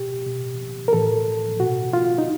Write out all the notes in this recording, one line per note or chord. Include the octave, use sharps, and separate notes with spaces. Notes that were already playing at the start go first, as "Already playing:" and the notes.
Already playing: B2 G4
B2
A#4
A2 E3 A4
B2 F#4
F4
D#4